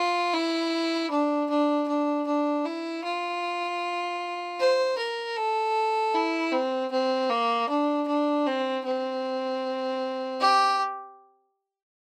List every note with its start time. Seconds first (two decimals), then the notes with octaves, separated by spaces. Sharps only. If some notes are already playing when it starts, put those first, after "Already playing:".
Already playing: F4
0.33 E4
1.10 D4
1.50 D4
1.88 D4
2.27 D4
2.65 E4
3.04 F4
4.59 C5
4.98 A#4
5.37 A4
6.14 E4
6.52 C4
6.91 C4
7.30 A#3
7.69 D4
8.07 D4
8.47 C4
8.85 C4
10.40 G4